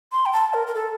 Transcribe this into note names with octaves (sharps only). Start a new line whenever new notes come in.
C6
G5
A5
A#4
A#4
A4